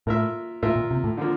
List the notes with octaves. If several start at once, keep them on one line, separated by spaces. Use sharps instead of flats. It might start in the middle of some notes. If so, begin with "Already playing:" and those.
A2 A#3 F4 A#4 E5
A2 A#3 F4 A#4 E5
A#2
C3
A2
D3 F3 A#3